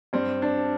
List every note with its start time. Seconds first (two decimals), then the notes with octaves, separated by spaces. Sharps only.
0.13 G2 C4
0.42 D4